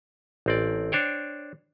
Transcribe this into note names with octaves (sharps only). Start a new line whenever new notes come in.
A1 C4 D5
D4 C5 C#5 G5